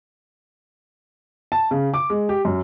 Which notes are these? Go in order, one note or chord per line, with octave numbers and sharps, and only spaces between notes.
A5
C#3
D6
G#3
G4
F#2